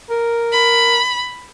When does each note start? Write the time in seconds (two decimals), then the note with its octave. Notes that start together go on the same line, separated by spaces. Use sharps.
0.10 A#4
0.52 B5